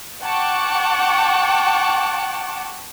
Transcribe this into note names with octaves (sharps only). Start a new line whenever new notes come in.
F#5 G5 A5 C#6 D6